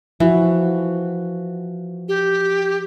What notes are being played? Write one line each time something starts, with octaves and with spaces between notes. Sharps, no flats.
E3 F3 F#4
G4